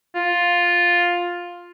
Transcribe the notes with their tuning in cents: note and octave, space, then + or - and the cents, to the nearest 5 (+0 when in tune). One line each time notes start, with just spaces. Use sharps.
F4 +5